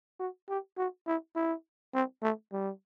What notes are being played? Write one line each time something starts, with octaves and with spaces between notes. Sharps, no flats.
F#4
G4
F#4
E4
E4
C4
A3
G3